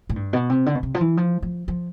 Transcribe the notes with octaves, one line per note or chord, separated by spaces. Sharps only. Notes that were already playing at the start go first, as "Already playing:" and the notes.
A2
G2
B2
C3
D3
B2
C3
F3
E3
F3
F3
F3